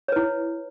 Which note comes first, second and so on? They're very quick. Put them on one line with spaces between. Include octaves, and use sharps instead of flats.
C#5 B4 E4